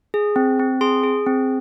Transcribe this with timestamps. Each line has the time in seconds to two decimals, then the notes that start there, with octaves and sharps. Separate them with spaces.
0.14 G#4
0.36 C4
0.59 C4
0.81 G#4 C6
1.04 G#4
1.26 C4